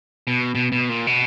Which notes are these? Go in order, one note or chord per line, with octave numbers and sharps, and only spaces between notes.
B2
B2
B2
A#2
B2